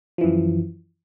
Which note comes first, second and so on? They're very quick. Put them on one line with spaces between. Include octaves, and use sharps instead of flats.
F3 E3 F#2